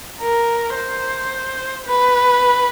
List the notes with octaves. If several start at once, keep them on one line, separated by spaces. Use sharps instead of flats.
A#4
C5
B4